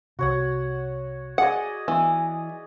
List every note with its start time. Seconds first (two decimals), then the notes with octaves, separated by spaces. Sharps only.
0.19 C2 C3 F#4 C#5 F#5
1.38 G#4 D5 D#5 F#5
1.88 E3 B3